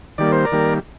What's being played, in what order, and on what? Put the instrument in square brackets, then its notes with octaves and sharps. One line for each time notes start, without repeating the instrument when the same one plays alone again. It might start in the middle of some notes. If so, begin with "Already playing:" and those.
[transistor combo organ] D#3 G3 A#3 D5
C5
A#4 D5
D#3 G3 A#3